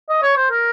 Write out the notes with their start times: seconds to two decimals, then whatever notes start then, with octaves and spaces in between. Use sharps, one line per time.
0.10 D#5
0.23 C#5
0.37 C5
0.51 A#4